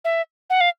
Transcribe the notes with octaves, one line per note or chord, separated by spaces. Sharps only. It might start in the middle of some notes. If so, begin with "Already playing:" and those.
E5
F#5
F5